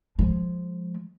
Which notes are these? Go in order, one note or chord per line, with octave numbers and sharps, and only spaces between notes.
F3 G#3